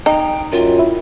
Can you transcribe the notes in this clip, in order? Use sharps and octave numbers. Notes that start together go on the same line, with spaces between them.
D#4 G5
F#2 F4
E4